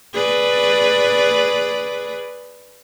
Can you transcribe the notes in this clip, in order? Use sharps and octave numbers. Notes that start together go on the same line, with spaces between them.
G#4 B4 D5